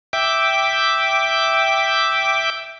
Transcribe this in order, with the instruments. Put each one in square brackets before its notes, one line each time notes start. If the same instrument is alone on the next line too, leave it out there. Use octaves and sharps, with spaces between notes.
[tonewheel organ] E5 G5 D6